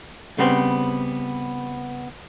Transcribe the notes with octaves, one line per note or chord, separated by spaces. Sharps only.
C#3 G3 B3 C4